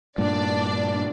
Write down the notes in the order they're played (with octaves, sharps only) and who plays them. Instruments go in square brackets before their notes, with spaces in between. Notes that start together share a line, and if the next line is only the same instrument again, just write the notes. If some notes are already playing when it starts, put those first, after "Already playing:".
[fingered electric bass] G2 A#2 [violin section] D4 D5